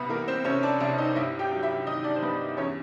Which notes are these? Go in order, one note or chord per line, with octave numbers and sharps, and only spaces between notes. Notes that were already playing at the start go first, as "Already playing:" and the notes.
Already playing: C2 B3 B4
E3 A#3 A#4
C4 C5
C3 C#4 C#5
D4 D5
C2 D4 D5
D#4 D#5
G2 E4 E5
G4 G5
F#3
E4 E5
D#3 D#4 D#5
D4 D5
C5
G2 B3 B4
E2 C#4 C#5